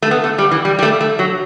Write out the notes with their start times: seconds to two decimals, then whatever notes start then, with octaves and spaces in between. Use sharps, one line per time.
0.02 A3
0.11 B3
0.24 A3
0.38 G3
0.51 E3
0.65 G3
0.79 G3
0.83 A3
1.01 A3
1.19 F#3